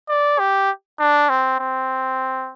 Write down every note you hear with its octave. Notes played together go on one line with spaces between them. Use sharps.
D5
G4
D4
C4
C4